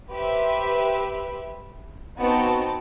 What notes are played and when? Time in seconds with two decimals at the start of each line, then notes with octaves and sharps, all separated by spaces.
0.11 G4 B4 C5 E5
2.19 B3 C4 D#4 F#4 G5 A5